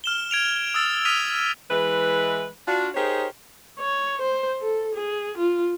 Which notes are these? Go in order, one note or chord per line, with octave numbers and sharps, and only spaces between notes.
F6 E7 G7
G#6 D7 F7
D#6 E6 A6
D#6 F6 B6 D#7 F7
E3 G#3 B4
D4 F4 F#4
D#4 G4 G#4 A#4 C5 C#5
C#5
C5
A4
G#4
F4